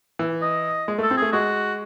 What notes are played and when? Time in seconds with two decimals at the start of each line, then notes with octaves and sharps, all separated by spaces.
0.19 E3
0.42 D#5
0.88 G#3
0.98 A3
1.03 A4
1.11 C4
1.17 A3 G#4
1.32 G#3 F#4